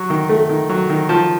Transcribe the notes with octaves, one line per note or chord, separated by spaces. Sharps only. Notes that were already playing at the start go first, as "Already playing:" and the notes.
Already playing: F#3 C#6
D#3
A3
D#3
F#3
D#3
F3 A5